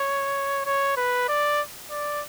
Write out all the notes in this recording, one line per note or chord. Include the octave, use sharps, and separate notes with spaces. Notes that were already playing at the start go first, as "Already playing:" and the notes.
Already playing: C#5
C#5
B4
D5
D5